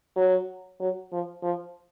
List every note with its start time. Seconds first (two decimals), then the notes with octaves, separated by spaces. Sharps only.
0.16 F#3
0.80 F#3
1.12 F3
1.43 F3